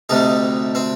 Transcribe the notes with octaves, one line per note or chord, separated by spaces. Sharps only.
D2 C3 G3 D#4
C4